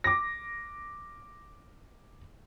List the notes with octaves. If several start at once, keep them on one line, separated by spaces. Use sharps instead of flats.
D6 A#6